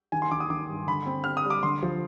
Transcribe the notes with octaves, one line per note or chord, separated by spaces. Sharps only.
D#3 G#5
C6
D#3 D6
D#6
D#3 D6
G2
D3 B5
C4
C4 F6
D#6
G3
D6
D3 C6
F3